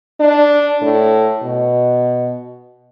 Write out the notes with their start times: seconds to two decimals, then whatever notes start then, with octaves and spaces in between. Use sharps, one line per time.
0.20 D4
0.81 A2
1.42 B2